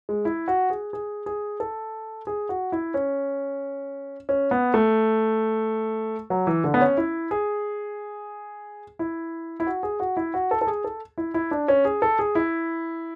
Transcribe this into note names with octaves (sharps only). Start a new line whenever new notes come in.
G#3
E4
F#4
G#4
G#4
G#4
A4
G#4
F#4
E4
C#4
C#4
B3
A3
F#3
E3
D3
B3
C#4
E4
G#4
E4
E4
F#4
G#4
F#4
E4
F#4
A4
A4
G#4
A4
E4
E4
D4
C#4
G#4
A4
G#4
E4